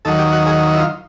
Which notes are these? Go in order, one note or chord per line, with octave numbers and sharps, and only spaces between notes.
D#2 D#3 F#3 A4
G4
F#4
G#4
E4
F4